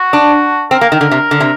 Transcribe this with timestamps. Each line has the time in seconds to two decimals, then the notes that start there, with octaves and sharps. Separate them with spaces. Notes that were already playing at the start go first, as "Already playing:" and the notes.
Already playing: F#4
0.13 D4
0.71 C4 A#4
0.81 A#3
0.92 D#3
1.01 D3
1.11 C3
1.31 D3
1.40 C3